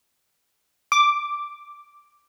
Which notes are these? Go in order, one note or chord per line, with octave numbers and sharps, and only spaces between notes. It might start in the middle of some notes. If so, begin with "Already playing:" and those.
D6